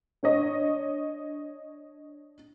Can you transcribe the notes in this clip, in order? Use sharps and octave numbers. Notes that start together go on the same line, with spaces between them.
D4 C#5 D#5